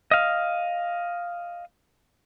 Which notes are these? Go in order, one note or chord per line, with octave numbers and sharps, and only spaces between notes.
D#5 F5